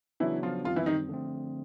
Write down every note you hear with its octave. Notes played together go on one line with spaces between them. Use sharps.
C#3 E3 F#3 B3 D4 E4
F3 F4
F#2 D#3 F3 G3 C4 F4
E3 E4
D#3 D#4
D3 F3 A3 C4